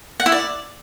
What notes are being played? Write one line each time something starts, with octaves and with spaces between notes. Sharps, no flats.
F#5
E4
D5